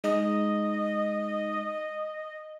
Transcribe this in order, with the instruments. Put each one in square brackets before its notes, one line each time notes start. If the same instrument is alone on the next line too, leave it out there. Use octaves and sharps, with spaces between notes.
[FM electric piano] G#3 D#4 [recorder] D#5